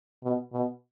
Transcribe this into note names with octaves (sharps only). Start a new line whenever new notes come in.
B2
B2